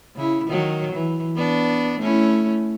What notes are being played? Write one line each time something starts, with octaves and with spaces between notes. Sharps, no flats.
C#3 E4
D#3 F#3
E3
B3 D4
A3 C#4 E4